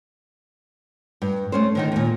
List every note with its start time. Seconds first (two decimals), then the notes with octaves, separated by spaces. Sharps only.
1.22 G2
1.52 A3 C#4 C5
1.75 D3 D#3 D#4
1.92 D#2 A#2